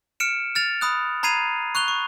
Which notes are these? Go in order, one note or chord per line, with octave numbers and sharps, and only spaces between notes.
F6 C#7 D7 E7
F6 A6 F7
B5 D#6 F#6
A#5 B5 G#6 C7 D#7 F7
C#6 F#6 F7 G7
C#6